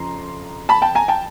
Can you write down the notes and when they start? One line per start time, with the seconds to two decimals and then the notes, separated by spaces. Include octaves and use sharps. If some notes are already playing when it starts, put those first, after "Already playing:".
Already playing: F2 C#3 F3 A#5 C6
0.69 A5 B5
0.82 G5 A5
0.95 G#5 A#5
1.08 G5 A5